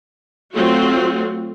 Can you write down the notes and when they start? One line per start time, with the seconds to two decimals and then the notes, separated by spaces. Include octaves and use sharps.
0.55 F#3 A3 C4 F4 F#4